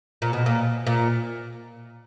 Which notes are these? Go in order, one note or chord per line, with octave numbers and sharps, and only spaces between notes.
A#2
B2
A#2
A#2